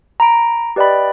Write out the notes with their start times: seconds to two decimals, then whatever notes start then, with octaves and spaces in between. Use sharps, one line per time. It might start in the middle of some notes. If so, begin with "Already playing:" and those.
0.20 A#5 B5 D7
0.76 G4 B4 D5 D#5 G5 B5